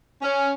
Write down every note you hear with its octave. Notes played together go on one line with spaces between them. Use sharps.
C#4